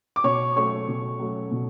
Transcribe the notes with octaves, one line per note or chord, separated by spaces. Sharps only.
D6
B2 C#5 C#6
F#3 A3 C#4 C#5 C#6
B2
F#3 A3 C#4
B2